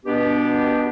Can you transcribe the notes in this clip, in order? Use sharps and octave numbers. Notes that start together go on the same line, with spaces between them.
B2 B3 D4 G4